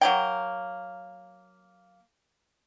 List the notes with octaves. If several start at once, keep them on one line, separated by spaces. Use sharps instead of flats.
F#3 A#3 G5